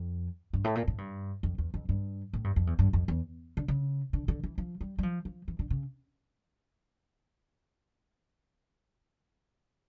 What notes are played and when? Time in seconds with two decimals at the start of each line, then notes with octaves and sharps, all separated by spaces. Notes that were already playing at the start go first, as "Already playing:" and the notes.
Already playing: F2
0.53 G2
0.64 A2
0.75 A#2
0.88 A2
0.98 G2
1.43 F2
1.58 E2
1.74 F2
1.89 G2
2.33 A2
2.44 G2
2.56 F2
2.67 E2
2.79 G2
2.93 F2
3.08 E2
3.57 D3
3.68 C#3
4.13 D3
4.28 D3
4.44 E3
4.58 F3
4.81 G3
4.98 G3
5.03 F3
5.25 F3
5.48 E3
5.59 D3
5.70 C#3